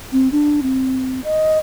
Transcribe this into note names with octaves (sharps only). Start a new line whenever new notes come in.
C4
D4
C4
D#5